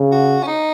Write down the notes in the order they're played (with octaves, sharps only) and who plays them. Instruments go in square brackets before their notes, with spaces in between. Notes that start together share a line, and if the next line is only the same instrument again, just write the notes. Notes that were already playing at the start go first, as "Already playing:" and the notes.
Already playing: [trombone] C#3
[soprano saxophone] F#4
C#4
D#4